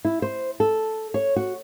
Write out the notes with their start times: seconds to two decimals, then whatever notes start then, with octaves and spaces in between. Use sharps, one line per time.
0.05 E4
0.22 C5
0.60 A4
1.14 C#5
1.36 F#4